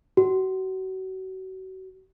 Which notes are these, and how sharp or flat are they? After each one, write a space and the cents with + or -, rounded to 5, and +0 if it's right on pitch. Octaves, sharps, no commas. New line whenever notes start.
F#4 +35